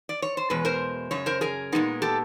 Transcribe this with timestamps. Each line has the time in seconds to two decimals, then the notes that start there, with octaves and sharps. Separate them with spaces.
0.09 D5
0.22 C#5
0.37 C5
0.50 E2 B2 G#3 B4
0.65 A#4 C5
1.11 F#2 C#3 C#5
1.26 A#4 C5
1.41 G#4 A#4
1.72 A#2 F3 G#3 B3 D#4
2.02 G4 A4